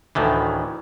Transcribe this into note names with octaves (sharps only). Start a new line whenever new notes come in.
D2 A2 D#3 E3